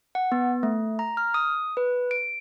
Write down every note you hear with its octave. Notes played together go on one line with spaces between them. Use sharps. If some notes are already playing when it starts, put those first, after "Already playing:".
F#5
B3
A3
A#5
F6
D#6
B4
D7